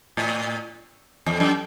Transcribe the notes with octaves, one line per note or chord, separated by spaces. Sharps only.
A2
E2
F#2